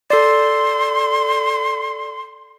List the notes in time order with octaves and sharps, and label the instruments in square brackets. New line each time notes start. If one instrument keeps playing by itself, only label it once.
[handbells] A4 D5 [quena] C6